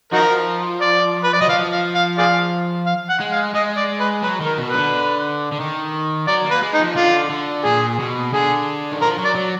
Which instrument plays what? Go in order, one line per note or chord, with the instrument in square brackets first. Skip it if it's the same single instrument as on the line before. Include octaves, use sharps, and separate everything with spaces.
[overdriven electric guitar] F3 [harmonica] D#4 F#4 A#4
[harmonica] D5
B4
D5
[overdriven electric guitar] F#3 [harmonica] D#5
[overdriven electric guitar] F3 [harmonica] F5
[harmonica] F5
F5
G#4 D5 F5
F5
F#5
[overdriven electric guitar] G#3
[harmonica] F5
[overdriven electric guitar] G#3 [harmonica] D#5
[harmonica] D5
B4
[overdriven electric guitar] F#3 [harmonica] B4
[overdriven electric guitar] D#3 [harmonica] A#4
[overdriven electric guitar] B2
[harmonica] B4
[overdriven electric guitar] D3
D3
D#3
[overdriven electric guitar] F#3 [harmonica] D5
[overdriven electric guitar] A#3
[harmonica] B4
[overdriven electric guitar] G#3
[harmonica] D#4
[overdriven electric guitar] F3
[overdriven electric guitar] D3 [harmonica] F4
[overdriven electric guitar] D3
[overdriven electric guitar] A#2 [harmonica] G#4
[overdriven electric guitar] B2
[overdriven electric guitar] D3 [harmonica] G#4
[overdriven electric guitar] D#3
[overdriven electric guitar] F3 [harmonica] A#4
[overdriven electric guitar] F#3
[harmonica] D5
[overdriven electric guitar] F#3